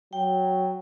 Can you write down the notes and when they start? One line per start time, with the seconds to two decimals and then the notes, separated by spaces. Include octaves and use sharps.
0.13 F#3 G5